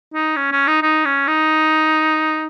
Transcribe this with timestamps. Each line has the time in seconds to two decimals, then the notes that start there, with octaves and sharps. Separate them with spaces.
0.14 D#4
0.36 C#4
0.52 C#4
0.67 D#4
0.82 D#4
1.05 C#4
1.28 D#4